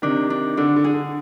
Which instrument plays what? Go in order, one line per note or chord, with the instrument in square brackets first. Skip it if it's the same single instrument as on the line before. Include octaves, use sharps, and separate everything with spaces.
[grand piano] C3 D#3 [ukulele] D4
[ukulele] D4
[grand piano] D3 [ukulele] D4
[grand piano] D3
[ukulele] G#4
[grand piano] D3